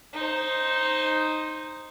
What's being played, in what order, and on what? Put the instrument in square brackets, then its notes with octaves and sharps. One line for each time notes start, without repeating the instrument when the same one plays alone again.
[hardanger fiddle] D#4 C5